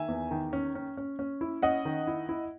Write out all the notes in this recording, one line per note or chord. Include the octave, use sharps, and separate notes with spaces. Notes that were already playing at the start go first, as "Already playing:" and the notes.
Already playing: D#3 E5 G#5
E2
D#3
C#4
C#4
C#4
C#4
E4
C#4 D#5 F#5
D#3
E4
E4